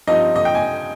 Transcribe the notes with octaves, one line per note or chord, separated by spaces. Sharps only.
G2 F3 C4 D#4 D#5
D#5
G5
G#5